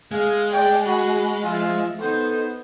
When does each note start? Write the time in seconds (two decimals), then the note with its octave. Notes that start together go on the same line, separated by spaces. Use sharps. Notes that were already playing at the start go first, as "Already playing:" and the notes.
0.11 G#3 G#4 F5
0.52 D5 G5
0.86 F#4 B5
1.43 F3 F4 E5
1.99 B3 D#4 A4 C5